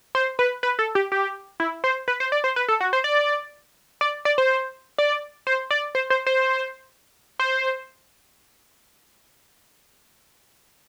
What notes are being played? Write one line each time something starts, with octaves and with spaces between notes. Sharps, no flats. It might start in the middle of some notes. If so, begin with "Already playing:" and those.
C5
B4
B4
A4
G4
G4
E4
C5
B4
C5
D5
C5
B4
A4
F#4
C5
D5
D5
D5
C5
D5
C5
D5
C5
C5
C5
C5